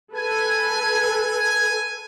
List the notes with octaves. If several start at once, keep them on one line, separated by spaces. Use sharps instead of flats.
A4 B4 G#5